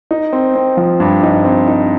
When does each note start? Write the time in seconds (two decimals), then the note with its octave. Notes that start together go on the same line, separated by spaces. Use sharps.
0.11 D#4
0.33 C4
0.55 C4
0.77 F3
1.00 G2
1.23 D#4
1.45 C4
1.68 D#4